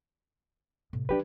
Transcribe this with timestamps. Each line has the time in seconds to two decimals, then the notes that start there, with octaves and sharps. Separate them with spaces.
0.93 A2 C3
1.09 F#3 D4 G4 B4